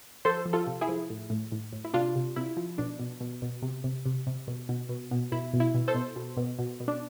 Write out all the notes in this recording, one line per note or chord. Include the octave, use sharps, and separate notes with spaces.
F3 A4 C5
F3
F4 A4
C3
E4 G#4
F3
A2
A2
A2
A2
E4
C3 D4 F4
C3
C3 E4
F3
B2 D4
B2
B2
B2
C3
C3
C3
C3
B2
B2
B2
B2
B2 E4
B2
E4
B2
A4 C5
B2
B2
B2
B2
B2
D4